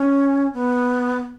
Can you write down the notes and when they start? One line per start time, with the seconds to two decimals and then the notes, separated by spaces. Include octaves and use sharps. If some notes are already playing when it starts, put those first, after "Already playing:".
Already playing: C#4
0.54 B3